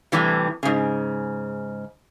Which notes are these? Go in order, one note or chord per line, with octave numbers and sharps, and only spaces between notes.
A2 C3 E3 G3
G#2 C#3